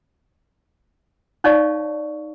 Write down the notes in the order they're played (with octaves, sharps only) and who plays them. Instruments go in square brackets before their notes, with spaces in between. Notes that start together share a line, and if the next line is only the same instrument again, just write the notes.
[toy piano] D#4 C#5 D5 F5 A5 C#6